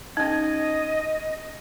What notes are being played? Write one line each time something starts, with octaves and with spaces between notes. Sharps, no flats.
C#4 D#4 D#5